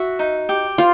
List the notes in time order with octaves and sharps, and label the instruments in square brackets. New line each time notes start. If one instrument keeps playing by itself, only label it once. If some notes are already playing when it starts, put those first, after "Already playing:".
Already playing: [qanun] F#4 [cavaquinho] E5
[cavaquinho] D#4
G4
[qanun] F4 [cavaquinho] C5